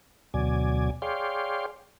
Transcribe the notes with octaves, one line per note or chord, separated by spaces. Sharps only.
D2 B2 F#3 D5 G#5
G#4 C#5 D5 F5 G5 C6